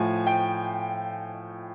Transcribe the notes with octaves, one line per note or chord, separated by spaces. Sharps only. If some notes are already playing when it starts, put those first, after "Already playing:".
Already playing: A2 F3 G#5
G5